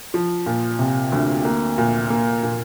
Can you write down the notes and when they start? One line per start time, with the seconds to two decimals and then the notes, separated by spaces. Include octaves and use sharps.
0.14 F3
0.46 A#2
0.79 C3
1.12 D2
1.45 A#3
1.78 A#2
2.10 A#3
2.43 A#2